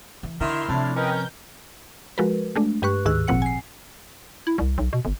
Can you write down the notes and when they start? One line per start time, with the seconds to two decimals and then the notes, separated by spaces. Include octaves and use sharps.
0.23 E3
0.41 D3 D#3 E4 C6 F6
0.69 A2 C3 F3 D4
0.96 C#4 A#4 B4 D#5 G5
1.11 G6
2.18 F3 G#3 F#4 A#4 B4
2.56 G#3 A3 D4
2.82 G2 G4 B4 C#6 F#6
3.05 D2 G#2 D#3 G#4 E6 F#6
3.28 G#1 A#2 F3 C4 F#5 C#7
3.42 G#5 C7
4.47 E4
4.58 C2
4.78 B1
4.93 B2
5.05 G1